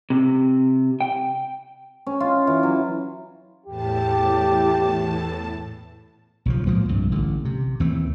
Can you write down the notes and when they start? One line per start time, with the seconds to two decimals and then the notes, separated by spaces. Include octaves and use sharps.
0.10 C3
1.00 G5
2.07 C#4
2.20 F4
2.47 E3
2.63 F#3
3.66 E2 A2 G4 A5
6.46 B1 C#3 F3
6.66 A2 F3 G#3 A#3
6.88 C2 G2
7.12 A1 D3
7.45 C3
7.80 D#2 E3 A3 C4